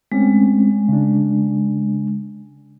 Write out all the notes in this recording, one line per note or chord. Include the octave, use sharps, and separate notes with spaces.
G#3 A3 C4 C#4
C#3 D4